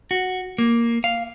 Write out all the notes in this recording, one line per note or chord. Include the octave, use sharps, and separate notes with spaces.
F#4
A#3
F5